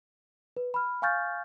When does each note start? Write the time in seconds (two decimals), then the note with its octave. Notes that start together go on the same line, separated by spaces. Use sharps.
0.57 B4
0.74 B5 F6
1.02 F5 G#5 C#6 F6 G6 A6